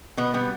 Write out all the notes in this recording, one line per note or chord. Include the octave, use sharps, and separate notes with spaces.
B2 B3
G3 B3